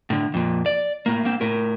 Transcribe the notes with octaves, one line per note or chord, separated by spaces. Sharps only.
A2 D3
F2 A#2
D5
A2 A#3
A#3 C4
A2 A#4